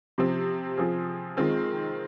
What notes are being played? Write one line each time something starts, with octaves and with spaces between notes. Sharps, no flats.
C3 F3 C4
F3 C4 F4 G#4
D#3 G#3 C4 F4